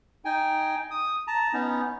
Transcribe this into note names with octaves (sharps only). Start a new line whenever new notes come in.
D#4 G5 G#5
D#6
A5 A#5
B3 C#4 D#4